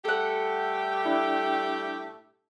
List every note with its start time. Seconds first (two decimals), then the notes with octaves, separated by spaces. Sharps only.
0.05 G3 A3 G4 A4 F#5
1.06 D4 E4